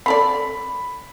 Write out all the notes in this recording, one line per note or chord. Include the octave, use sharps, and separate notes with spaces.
C4 A4 D5 B5